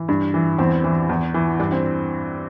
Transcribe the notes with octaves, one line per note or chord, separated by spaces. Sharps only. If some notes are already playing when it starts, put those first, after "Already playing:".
Already playing: E3
G2
E3
E2 C4
E3
E2
E3
G2 D4
C4